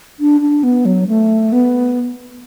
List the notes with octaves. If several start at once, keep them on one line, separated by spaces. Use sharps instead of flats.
D4
D4
B3
F#3
A3
B3